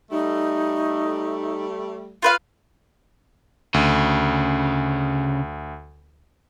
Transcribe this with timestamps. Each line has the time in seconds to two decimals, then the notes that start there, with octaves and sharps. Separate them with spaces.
0.11 G3 A3 D#4
2.22 F4 B4 F5
3.74 D2 C#3